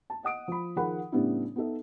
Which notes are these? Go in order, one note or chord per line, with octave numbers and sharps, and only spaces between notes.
A5
D#5 F#5 D#6 D7
F3 B5
D#3 F3 G#4 A#4 F#5 B5
A2 C#3 G3 B3 D4 E4
B3 D#4 A4 E5